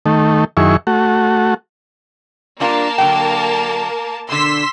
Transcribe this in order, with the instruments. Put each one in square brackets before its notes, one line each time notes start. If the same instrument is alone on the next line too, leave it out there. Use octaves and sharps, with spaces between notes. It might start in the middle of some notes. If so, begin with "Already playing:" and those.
[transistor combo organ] D#3 A3
F#2 D#3 E4 G#4 C#6
A3 F#4
[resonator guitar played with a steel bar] G3 D4 F4 [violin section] A#3 A#4 A5
[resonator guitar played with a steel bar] D3 F#3 G5
[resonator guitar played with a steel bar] B2 D3 [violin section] C6 E6 B6